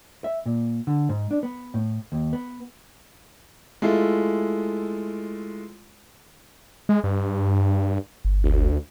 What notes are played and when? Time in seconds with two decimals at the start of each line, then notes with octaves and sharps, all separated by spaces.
0.24 E5
0.46 A#2
0.87 D3
1.09 G#2
1.31 D4
1.43 B3
1.74 A2
2.12 D#2
2.33 B3
3.82 G#3 A3 E4 F4
6.89 G#3
7.04 G2
8.25 G1
8.44 D2